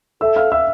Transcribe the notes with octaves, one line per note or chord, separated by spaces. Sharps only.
A4 E5 E6
F5 F6
E5 E6